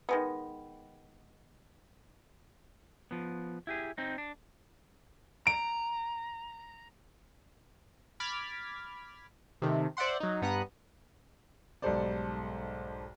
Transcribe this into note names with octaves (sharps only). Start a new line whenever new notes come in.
D#3 G#3 B3
F3 B3
E4 G4 G#4
C4 D#4
D4
A#5 D7
B5 D6 F6 G#6 A6 B6
C3 D#3 A3
C5 D5 E5 F#5 C6
F#3 D#4
G2 B3 A#5 D#6 F#6
B1 G#2 G3 A4 C5 D5